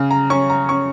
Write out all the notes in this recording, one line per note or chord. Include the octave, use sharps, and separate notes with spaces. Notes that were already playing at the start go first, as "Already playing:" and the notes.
Already playing: C#3
A#5
C#4 C#6
A#5
C#4 C#6